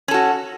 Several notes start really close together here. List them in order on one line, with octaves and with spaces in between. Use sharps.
C#4 A4 F#4